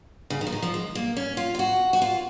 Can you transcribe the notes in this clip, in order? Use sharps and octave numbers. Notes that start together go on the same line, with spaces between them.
C#3
D#3
F3
D#3
F3
G#3
A#3
C#4
F4
F4
F#4
F#4
F4